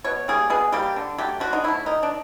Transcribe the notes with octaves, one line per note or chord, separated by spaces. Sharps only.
B2 C#5
G3 A#3 G#4
B2 G#4
G3 A#3 G4
D3
F#3 A3 G4
D3 F#4
D#4
F#3 A3 E4
D#3 D#4
D4